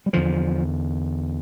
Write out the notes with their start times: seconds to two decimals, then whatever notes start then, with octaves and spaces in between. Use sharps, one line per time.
0.06 G3
0.13 E2 D3 F3